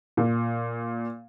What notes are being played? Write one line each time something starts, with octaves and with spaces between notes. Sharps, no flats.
A#2